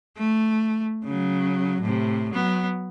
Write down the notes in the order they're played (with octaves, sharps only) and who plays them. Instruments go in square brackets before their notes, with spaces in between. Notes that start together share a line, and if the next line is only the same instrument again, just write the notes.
[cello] A3
C#3 F#3
A2 C3
F#3 B3